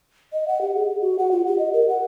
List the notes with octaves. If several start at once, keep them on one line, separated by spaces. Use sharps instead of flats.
D#5
F#5
G4
G#4
F#4
F#5
F4
G4
D#5
A#4
F#5